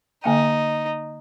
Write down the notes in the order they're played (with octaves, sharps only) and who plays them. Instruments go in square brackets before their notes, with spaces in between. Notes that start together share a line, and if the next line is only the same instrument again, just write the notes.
[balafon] D3 A#3 G5 [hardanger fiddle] D#4